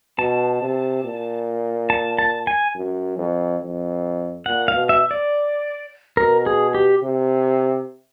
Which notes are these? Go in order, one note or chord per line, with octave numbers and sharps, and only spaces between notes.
B2 A5
C3
A#2
A5
A5
G#5
F#2
F2
F2
A#2 F#5
F5
B2
E5
D5
B2 A#4
G#4
G4
C3